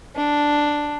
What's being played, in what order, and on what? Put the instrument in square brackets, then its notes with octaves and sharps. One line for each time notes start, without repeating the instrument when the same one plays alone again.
[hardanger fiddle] D4